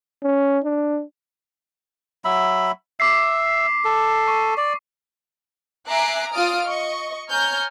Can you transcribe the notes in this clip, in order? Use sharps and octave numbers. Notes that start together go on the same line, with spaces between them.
C#4
D4
F#3 E5 B5
E5 D6 B6 C7
A4
C#6
D5
E5 G#5 A#5 D6 F#6 C7
F4 D5 D#6 F6 D7
D#5 C#6
C#5 G#5 A#5 F6 G6